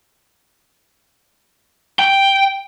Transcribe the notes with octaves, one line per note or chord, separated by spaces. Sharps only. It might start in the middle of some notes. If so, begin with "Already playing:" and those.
G5